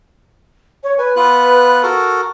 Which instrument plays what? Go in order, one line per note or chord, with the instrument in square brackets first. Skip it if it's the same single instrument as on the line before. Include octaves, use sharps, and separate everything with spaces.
[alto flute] C#5
[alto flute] B4 [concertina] G#5
[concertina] B3 F4 F#6
F#4 A4 A#4